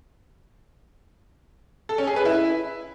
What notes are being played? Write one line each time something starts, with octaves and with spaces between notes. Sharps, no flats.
A4
C#4
G#4
B4
E4